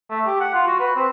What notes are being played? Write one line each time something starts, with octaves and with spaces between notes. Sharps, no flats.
A3
G4
F#5
F4
F#4
B4
C4